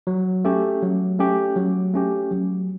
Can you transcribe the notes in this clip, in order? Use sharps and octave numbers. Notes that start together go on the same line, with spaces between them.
F#3
A3 C#4 G4
F#3
A3 C#4 G4
F#3
A3 C#4 G4
F#3